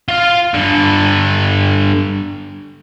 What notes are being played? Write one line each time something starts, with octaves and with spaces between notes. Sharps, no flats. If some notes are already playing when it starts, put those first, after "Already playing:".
F4 F5
G2 D3